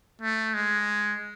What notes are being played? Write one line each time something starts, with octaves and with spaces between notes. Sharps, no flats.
A3
G#3